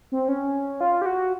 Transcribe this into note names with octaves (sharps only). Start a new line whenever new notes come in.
C4
C#4
F4
G4
F#4